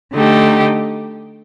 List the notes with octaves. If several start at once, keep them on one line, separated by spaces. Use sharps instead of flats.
D3 A3 D#4 G4